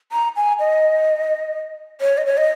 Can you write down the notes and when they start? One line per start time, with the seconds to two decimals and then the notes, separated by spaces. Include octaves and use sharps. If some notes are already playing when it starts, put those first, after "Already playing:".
0.12 A#5
0.36 G#5
0.60 D#5
2.01 C#5
2.18 D#5
2.26 C#5
2.37 D#5